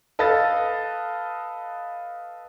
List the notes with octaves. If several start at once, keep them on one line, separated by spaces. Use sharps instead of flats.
A4 B4 D#5 F5 A6